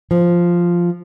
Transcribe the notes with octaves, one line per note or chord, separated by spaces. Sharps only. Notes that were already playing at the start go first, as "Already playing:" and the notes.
F3